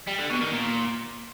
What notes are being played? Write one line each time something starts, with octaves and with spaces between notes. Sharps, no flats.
G3
D3
B2
D#3
A#2